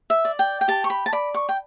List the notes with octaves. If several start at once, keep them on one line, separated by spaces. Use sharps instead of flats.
E5
D5
G5
G5
G4 A5
C#6
B5
A5
D5 B5
C#6
G5